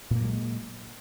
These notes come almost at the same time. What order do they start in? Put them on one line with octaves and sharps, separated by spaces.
A#2 A#3 F#3 G#3